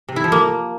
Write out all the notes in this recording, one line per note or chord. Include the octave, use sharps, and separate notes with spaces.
C3
E4
F3
A#3